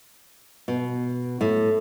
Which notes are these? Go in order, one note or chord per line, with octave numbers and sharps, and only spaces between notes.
B2
A2